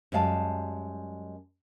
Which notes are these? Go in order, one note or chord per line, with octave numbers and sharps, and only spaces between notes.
F#2 G3 G#3 F5 A5